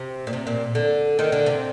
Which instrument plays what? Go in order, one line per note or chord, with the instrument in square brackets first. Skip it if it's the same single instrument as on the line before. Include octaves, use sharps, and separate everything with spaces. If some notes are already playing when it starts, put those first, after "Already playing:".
Already playing: [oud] C3
A#2
C3
A#2
D3
D#3
D3
C3